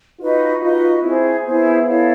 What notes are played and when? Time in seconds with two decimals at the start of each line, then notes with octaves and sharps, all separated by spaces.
0.20 D#4 F4 F#4 B4 D#5
0.61 D#4 F4 F#4 B4 D#5
1.03 C4 E4 G#4 C5
1.45 B3 E4 G#4 C5
1.86 E4 A4 C#5 F5